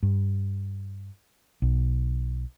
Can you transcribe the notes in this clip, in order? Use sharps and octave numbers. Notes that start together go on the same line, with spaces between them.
G2
B1